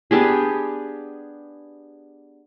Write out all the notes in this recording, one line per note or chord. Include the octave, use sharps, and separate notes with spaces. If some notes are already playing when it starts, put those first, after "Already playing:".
B3 D4 G4 G#4